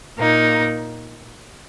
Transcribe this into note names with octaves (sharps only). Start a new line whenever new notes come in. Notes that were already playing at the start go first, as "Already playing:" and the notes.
A#2 A#3 D#4